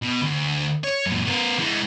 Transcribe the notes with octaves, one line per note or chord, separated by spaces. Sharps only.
B2
D2
C#5
F#2 A#2
B3 A#4
G#3 E4